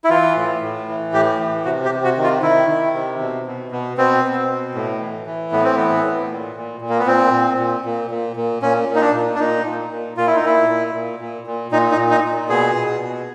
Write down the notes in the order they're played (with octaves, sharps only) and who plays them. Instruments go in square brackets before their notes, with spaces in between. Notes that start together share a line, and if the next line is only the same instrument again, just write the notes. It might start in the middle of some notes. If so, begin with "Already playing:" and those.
[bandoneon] E4
E3 F4
A2
A2
E3
A2 G4
E3
C3 F#4
G4
C3
F#4
D#3
F4
D#3 E4
D#3
C3
B2
B2
B2
B2 C4
B2
B2
A2
E3
E3
A2 B3
C4
E3 B3
A2
A#2
A#2
A#2
A#3
B3
A#2 C4
A#2
A#2
A#2
A#2
A#2
A#2 C#4
A#2
D#4
D4
A#2
D4
A#2 D#4
A#2
A#2
A#2 F4
E4
D#4
A#2 E4
A#2
A#2
A#2
A#2
A#2 D#4
D#4
A#2
D#4
A#2
B2 G#4
B2
B2